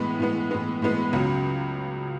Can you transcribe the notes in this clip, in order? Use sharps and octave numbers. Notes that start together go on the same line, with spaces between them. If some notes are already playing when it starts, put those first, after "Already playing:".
Already playing: A2 E3 G#3 B3
A2 E3 G#3 B3
A2 E3 G#3 B3
A2 E3 G#3 B3
C#2 C#3 F#3